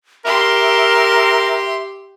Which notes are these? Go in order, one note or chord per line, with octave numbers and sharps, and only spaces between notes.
G4 A#4 E5 C6